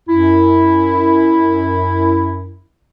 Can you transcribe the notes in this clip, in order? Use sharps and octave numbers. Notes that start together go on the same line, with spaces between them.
F#2 E4